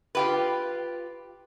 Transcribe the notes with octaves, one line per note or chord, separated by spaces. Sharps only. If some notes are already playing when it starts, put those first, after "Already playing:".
F4 G4 B4